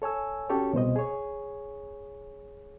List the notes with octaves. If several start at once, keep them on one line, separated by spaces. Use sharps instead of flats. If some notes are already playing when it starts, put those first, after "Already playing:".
A4 C#5 G#5 E6
C#4 F#4 G4 A4 C#5
C2 B2 C5 D#5
G#4 C#5